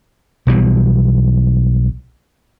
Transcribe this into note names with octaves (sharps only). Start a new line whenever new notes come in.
B1 B2 E3 G3